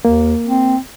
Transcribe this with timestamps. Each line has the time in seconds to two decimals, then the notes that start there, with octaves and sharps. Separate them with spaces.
0.05 D#2 A#3
0.47 C4